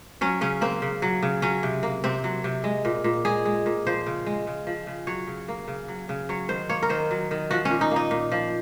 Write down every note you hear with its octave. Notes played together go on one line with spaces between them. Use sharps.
F#3 C#4
C#3 C#4
A#3 C4
C#3
F#3
C#3
F#3 C#4
C3
A#3
C3 C4
F#3
C3
G#3
A#2
A#2
G#3 G#4
G#3
A#2
F3 C5
C#3
G#3
C#3
F3
C#3
F#3 C#5
C#3
A#3
C#3
F#3
C#3
F#3 C#5
D#3 C5
A#3 C#5
A#4
D#3 C5
F#3
D#3
F3 F#4
C#4
A#2
D#4
A#3 D#4
A#2
F3